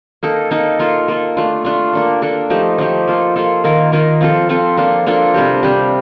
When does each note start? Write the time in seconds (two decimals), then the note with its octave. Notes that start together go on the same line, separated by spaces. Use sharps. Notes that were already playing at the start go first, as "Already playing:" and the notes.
0.23 A#3 D#4 A4
0.51 A#3 D#4 A4
0.79 A#3 F4 A4
1.08 A#3 F4 A4
1.37 A3 D4 F4
1.65 A3 D4 F4
1.93 A#3 D4 A4
2.22 A#3 D4 A4
2.50 F3 A3 D#4 G4
2.78 F3 A3 D#4 G4
3.07 A#3 F4 A4
3.36 A#3 F4 A4
3.64 D#3 A#3 F4 A#4
3.92 D#3 A#3 F4 A#4
4.21 F3 C4 F4 A4
4.49 F3 C4 F4 A4
4.77 A#3 D4 F4 A4
5.06 A#3 D4 F4 A4
5.34 C3 G3 D4 G4
5.63 C3 G3 D4 G4